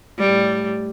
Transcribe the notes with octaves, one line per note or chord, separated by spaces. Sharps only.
A2 G3